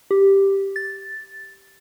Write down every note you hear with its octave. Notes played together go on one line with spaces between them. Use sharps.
G4
A6